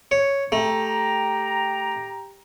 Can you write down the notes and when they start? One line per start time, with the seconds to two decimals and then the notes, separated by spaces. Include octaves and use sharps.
0.11 C#5
0.52 A3 G4 G5 A#5